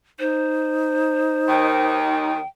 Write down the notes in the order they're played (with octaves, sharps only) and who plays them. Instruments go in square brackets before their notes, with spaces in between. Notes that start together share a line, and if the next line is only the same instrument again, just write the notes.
[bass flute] D#4 [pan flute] C5
[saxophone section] D#2 D#3 [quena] G5